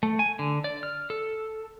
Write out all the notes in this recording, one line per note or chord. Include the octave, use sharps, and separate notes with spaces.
A3
G#5
D3
D5
F6
A4